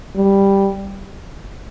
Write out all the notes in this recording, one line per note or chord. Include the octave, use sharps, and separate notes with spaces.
G3